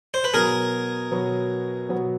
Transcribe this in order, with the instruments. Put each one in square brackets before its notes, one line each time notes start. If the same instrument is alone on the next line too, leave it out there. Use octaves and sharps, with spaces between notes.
[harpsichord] C5
B4
[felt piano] B2 F#3 B3 [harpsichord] G#4 A#4
[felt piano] B2 F#3 B3
B2 F#3 B3